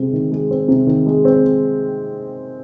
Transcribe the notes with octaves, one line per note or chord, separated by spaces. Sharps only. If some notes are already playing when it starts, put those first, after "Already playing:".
Already playing: C3 G#3 C4
D#3
G#3
C4
C3
D#3
G#3
C4